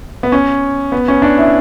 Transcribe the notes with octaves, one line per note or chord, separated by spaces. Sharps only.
B3
C#4
B3
C#4
D4
E4